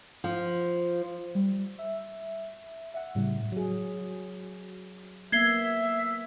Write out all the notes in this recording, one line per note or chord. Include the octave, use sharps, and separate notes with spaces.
F3
G3
E5
E5 F#5
A2 C#3 G3
F#3 G#4
A#3 B3 E5 G#6 C7 G7